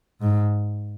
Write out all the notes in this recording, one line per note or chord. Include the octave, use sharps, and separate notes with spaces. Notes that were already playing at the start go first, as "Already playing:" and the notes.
G#2